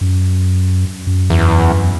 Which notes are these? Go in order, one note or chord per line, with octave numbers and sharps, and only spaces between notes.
F#2
F#2
E2